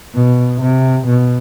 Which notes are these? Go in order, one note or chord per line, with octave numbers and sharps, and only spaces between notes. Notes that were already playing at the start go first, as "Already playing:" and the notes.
B2
C3
B2